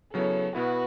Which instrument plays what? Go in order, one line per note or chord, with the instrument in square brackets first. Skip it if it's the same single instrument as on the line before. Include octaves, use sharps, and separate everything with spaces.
[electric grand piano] C#3 F#3 B3 E4 [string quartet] A4 C#5
[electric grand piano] B2 B3 E4 [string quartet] F#4 B4